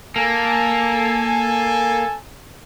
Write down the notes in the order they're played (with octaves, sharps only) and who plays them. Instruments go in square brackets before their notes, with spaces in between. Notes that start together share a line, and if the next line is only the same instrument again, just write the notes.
[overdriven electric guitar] A#3 [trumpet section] A4 G#5